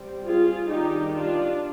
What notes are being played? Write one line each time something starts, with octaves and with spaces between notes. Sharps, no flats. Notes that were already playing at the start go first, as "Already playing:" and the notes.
Already playing: G3 C4
F4 G#4
D#3 G3 D4 D#4 G4
D4 F4